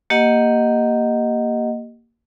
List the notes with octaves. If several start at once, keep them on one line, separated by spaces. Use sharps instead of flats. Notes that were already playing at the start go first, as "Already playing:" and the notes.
A#3 G4 D#5 F#5